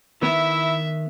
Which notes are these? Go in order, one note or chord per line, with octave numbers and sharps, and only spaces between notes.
D#3 B3 E4 E5